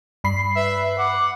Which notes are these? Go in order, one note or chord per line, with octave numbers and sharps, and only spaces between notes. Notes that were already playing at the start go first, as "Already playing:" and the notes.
G2 B5 C7
B4 E5
F#5 D6